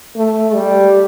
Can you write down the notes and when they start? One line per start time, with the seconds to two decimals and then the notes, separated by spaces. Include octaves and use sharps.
0.16 A3
0.55 G3